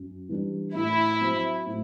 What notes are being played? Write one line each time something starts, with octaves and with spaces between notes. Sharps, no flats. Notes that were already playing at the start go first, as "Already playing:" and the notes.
Already playing: F#2
E3 G3 D4
A2 E4
F#3 C4
A2